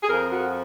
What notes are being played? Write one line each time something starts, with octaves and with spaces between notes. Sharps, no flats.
G#4
F2 F3 A#4
F#4